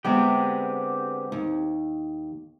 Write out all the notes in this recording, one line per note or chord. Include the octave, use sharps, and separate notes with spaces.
D3 G#3 B3 C4 G4
D#2